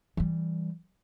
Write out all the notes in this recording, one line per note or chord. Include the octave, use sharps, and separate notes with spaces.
E3 G3